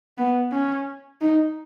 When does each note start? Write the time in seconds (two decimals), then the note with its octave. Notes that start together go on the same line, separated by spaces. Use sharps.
0.18 B3
0.52 C#4
1.21 D#4